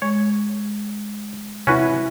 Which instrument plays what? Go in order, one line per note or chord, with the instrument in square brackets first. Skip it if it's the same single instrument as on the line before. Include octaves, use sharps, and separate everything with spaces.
[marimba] G#3 [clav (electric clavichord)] C#5
[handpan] C3 E4 [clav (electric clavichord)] C#4 F#4 B4